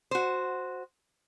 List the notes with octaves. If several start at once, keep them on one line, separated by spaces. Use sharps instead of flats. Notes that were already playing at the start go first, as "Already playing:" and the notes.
F#4 C5